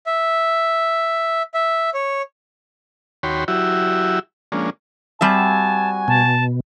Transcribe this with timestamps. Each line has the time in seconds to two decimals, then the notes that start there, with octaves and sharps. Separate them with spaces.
0.06 E5
1.54 E5
1.94 C#5
3.23 D#2 F#4 C#5 G5 B5 C6
3.48 F#3 E4 F#4 G4 E5
4.52 F3 G#3 A#3 C#4 D4
5.21 G3 C4 F#4 E5 G#5 A5
6.08 B2 A5